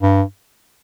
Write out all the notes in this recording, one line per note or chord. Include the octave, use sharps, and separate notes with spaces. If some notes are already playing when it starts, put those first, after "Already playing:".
G2